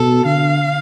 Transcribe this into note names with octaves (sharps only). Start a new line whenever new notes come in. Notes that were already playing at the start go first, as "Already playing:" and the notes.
Already playing: B2 A4
D3 F5